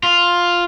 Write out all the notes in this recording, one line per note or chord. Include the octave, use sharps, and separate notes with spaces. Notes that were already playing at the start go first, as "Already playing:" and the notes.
F4